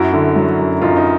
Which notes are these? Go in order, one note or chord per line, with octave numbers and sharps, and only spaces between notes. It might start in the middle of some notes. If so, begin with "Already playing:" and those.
Already playing: F#2 E4 F#4
D3
F#3
F#2
F#2 D#4 F4
D#4